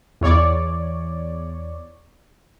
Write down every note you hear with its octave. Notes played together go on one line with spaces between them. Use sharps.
E2 C#5 D5